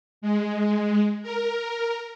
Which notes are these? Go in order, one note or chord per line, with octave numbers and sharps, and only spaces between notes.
G#3
A#4